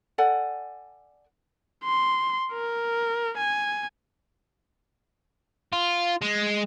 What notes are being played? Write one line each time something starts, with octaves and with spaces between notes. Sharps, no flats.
A4 D5 F#5 G#5
C6
A#4
G#5
F4
G#3